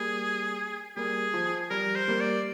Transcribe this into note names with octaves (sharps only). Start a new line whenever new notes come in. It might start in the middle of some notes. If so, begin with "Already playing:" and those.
Already playing: G3 A#3 G#4
G3 A#3 G#4
F3
G3 A#4
C5
G3 A#3
D5